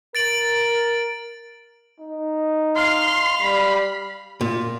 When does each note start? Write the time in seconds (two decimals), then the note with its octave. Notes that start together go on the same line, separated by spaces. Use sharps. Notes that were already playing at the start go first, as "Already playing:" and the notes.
0.15 A#4 A6 D7 F#7
2.00 D#4
2.76 F5 C6
3.42 G3 B5
4.41 A#2